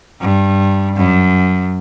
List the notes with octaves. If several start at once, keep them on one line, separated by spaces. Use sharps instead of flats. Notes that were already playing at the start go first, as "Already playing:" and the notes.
G2
F#2